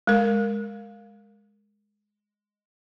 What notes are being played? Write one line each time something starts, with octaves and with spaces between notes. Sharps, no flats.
G#3 A#4